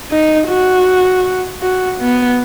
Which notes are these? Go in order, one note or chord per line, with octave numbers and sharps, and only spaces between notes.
D#4
F#4
F#4
B3